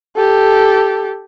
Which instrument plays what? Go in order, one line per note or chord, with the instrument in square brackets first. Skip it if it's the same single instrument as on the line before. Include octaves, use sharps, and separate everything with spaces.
[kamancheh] G4 A4